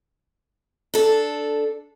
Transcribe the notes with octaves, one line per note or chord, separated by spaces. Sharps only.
D4 A4